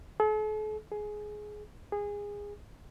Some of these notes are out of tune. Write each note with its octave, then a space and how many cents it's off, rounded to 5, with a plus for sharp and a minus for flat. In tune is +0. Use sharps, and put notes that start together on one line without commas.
A4 -45
G#4 +15
G#4 -20